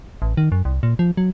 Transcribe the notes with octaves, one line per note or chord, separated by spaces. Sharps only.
A1
D#3
F#2
C2
A#2
F3
F#3